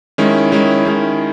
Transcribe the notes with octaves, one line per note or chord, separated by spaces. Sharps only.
D#3 G#3 C#4 E4
D#3 G#3 C#4 E4
D#3 G#3 C#4 E4